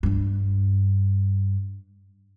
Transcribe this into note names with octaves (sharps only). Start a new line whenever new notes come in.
G2 D4